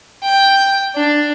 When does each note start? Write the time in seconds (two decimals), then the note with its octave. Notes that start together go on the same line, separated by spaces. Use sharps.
0.24 G5
0.96 D4